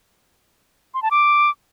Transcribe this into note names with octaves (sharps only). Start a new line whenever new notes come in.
C6
A5
D6